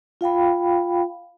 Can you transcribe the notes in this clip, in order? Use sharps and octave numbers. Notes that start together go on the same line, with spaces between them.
F4 F5 G5 B5